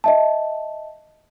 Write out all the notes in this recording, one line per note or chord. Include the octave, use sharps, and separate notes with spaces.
D#5 E5 A5